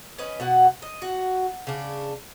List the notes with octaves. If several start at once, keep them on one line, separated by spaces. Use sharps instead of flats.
C#4 B4 D#5
B2 F#4 F#5
D#5
F#4
C#3 D4